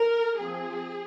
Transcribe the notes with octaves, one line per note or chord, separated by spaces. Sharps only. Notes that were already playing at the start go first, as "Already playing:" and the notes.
Already playing: A#4
F3 C4 G#4